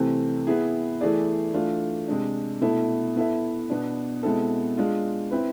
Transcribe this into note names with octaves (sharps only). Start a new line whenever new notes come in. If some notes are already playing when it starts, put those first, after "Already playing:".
Already playing: C3 E3 A3 C4
B3 E4 G#4
E3 A3 E4 G#4 D5
E3 A3 D4 F4
C3 G#3 D4
B2 A3 E4 A4
B3 E4 A4 E5
B2 B3 D4
B2 G#3 C4 E4 A4
G#3 D4 F4
C4 E4 B4